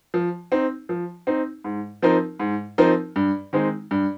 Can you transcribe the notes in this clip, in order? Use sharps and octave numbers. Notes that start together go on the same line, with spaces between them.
F3
C4 D#4
F3
C4 D#4
G#2
F3 C4 D#4 A#4
G#2
F3 C4 D#4 A#4
G2
D#3 G#3 C4 D#4
G2